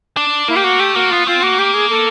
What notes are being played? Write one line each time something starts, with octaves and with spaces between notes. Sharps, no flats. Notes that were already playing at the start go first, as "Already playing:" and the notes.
D4
A#3 E4
G4
F#4
A3 G4
A#3 F#4
B3 F4
C4 F4
A#3 F#4
G4
G#4
A4